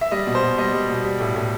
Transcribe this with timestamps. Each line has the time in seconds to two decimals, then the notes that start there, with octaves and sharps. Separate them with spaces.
0.01 E5
0.11 G3 D#5
0.27 B2
0.35 C5
0.43 B2
0.58 G3 D#5
0.74 G3
0.89 B2
1.05 G3
1.20 A2
1.36 A2